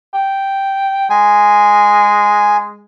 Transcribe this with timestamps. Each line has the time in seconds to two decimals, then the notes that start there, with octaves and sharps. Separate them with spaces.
0.14 G5
1.10 G#3 G#5